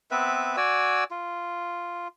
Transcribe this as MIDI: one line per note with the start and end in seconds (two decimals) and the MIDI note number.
0.11 0.56 59
0.11 0.56 60
0.11 0.56 71
0.11 0.56 76
0.57 1.04 66
0.57 1.04 74
0.57 1.04 80
0.57 1.04 88
1.11 2.08 65